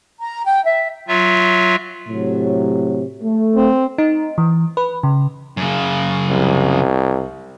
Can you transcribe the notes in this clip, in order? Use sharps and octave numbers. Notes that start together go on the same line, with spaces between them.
A#5
G5
E5
F#3 F4 E5
A2 C3 F#3
A3
C4
D#4
E3
B4
C#3
F#2 C#3
C2